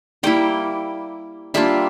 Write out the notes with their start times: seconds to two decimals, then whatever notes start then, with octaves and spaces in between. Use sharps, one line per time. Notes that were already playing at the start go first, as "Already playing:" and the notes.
0.23 G3 A#3 E4 G5
1.54 G3 A#3 D4 F4 E5